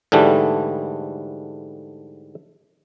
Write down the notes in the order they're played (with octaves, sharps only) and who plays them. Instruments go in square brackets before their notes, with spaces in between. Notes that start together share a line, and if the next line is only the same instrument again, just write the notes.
[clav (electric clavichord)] G#2 D3 E3 G3 A3